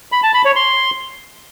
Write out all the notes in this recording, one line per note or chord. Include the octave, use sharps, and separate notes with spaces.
B5
A5
B5
C#5
C6